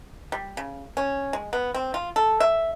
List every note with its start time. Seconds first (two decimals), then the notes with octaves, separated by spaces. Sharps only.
0.32 G3
0.57 C#3
0.97 C#4
1.33 G#3
1.53 B3
1.74 C4
1.94 F4
2.16 A4
2.40 E5